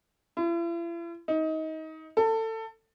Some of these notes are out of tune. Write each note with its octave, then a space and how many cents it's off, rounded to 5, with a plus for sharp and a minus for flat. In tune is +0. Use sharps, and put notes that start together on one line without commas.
E4 +45
D#4 +25
A4 +25